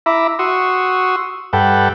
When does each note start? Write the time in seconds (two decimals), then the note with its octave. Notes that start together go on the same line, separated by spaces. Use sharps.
0.06 E4 E5 A#5 B5 D6
0.39 F#4 C6 C#6 D#6 E6
1.53 G2 A4 B4 F#5 G5